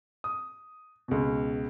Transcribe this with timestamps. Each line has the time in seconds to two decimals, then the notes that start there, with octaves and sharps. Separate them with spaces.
0.24 D#6
1.08 C#2 B2